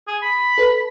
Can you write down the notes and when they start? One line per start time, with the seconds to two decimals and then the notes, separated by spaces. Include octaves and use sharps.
0.07 G#4
0.22 B5
0.58 A4 B4